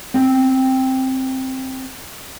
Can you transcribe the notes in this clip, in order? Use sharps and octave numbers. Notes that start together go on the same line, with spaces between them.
C4 G5